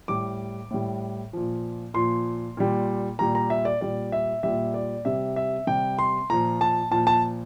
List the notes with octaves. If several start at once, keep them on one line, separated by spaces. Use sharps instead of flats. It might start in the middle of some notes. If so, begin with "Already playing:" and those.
A2 G3 D6
A2 G3
A#2 F3
A#2 F3 C6
A#2 G3
A#2 G3 A#5
A#5
E5
D5
A#2 G3 D5
E5
A#2 G3 E5
D5
C3 G3 E5
E5
C3 G3 G5
C6
A#2 F3 A#5
A5
A#2 F3 A5
A5